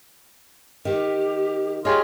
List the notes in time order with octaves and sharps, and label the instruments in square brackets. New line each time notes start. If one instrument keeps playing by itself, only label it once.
[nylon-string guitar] D#3 [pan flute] G4
[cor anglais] F4 [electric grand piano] G4 G#4 D#5 [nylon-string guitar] C#5 [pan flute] F6